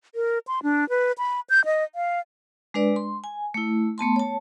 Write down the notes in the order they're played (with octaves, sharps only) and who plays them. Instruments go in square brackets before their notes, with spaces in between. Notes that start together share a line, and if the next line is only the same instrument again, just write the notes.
[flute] A#4
C6
D4
B4
B5
G6
D#5
F5
[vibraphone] G#3 D4 B4 D5
C6
G#5
A3 E4
A3 B3 A5 C6
C#5 A5